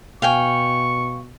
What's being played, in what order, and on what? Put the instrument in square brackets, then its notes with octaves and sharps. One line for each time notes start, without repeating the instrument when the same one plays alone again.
[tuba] B2 [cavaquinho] F5 G5 G#5 [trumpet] C#6